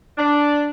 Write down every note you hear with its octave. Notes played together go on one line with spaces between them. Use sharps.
D4